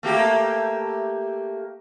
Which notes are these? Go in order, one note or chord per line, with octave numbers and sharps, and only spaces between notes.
A3 A#3 G4